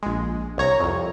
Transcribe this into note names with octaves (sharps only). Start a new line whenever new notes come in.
A#1 G#3
C2 C#5 A#5
C2 F2